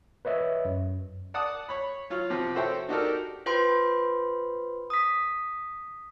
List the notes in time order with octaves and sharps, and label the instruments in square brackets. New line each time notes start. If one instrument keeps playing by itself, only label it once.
[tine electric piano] B4 C#5 D#5 E5
F#2
[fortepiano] D5 F#5 A5 D#6
C#5 B5
F#3 F4 C#5
C3 F3 C4
F#4 A4 C5 C#5 E5 G5
D4 D#4 F#4 G4 A4 A#4
[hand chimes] F4 B4 C5 G5 B5 C6
D#6 B6